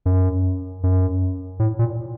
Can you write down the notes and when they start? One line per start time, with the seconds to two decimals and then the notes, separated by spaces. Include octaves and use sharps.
0.06 F#2
0.83 F#2
1.59 A2
1.79 A#2